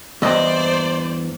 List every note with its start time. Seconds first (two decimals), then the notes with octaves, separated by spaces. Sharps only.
0.22 E2 G2 C5 D5 D#5